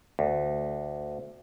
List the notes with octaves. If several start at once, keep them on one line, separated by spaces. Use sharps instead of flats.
D2